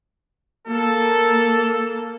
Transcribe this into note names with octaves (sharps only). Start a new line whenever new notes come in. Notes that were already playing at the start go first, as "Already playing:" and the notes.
A#3 A4